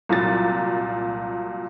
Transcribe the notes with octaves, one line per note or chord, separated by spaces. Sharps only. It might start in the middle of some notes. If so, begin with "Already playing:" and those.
C2 A#2 F#3 A6